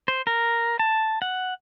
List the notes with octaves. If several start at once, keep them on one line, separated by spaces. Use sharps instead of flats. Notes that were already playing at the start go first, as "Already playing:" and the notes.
C5
A#4
A5
F#5